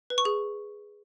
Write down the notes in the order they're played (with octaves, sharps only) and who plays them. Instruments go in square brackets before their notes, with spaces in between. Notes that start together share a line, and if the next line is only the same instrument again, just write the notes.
[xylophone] B4
C#6
G#4